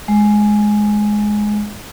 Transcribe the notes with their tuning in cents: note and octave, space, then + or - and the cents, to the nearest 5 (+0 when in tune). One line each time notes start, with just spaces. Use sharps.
G#3 +10